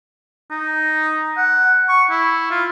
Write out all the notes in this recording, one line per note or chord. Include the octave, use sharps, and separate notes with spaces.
D#4
F#5
C#6
E4
F4